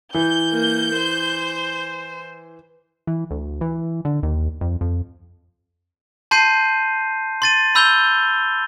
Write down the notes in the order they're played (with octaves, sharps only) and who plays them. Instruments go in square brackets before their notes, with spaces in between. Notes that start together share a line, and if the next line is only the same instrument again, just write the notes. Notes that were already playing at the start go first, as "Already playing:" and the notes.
[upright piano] E3 [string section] G6
[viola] A#3
C5
[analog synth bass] E3
D2
E3
D3
D#2
F2
F2
[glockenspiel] A5 C6 G6 C7 D#7
C6 A6 D#7
B5 E6 G6 F7 G7